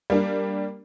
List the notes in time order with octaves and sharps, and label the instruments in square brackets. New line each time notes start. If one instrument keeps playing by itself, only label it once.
[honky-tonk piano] G3 A#3 D4